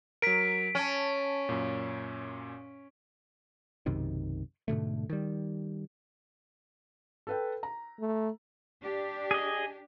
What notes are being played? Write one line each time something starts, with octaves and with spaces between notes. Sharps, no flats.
F#3 A#4 B6 D7
C#4 G#5 A5
F#2 A#2
B1 F#2 C3 D#3
G#2 B2 D3 A3
D#3 G3
A4 B4 G5
A#5
A3
D4 G4
G#4 D#5